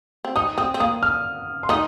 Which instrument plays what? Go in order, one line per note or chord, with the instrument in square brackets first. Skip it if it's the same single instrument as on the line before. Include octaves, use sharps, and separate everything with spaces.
[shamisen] C4
[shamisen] D#3 D#4 [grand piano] D#6
[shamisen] C4 [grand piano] D#6
[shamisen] C4
[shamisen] A#3 [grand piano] D#6
[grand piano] F6
C6
[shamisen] D#3 D#4 [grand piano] D#6